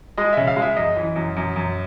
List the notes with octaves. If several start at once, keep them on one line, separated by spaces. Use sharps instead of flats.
G#3 D#5
C#3 E5
F5
G#3
E5
F#2 D#5
E3
F#2
F#2
F#2